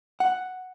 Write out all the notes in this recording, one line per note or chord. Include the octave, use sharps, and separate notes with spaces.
F#5